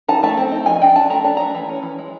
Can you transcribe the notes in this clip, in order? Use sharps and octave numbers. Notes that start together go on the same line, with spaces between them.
D#4 A5
A3 A5
C4
D#4
F3 G#5
D4 G5
D4 A5
A3 A#5
D4 A5
A3 A#5
E3
C#4
E3
G#3